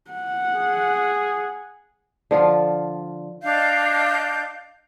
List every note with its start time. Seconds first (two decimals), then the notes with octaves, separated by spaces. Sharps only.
0.11 F#5
0.56 G#4
2.31 D3 F3 F4
3.42 D4 D#5 F5 G6